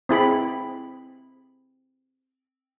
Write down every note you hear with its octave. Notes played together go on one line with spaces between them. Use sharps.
C4 E4 G#4 B5